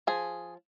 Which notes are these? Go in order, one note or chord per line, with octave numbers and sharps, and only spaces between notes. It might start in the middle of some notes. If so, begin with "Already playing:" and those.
F3 G#4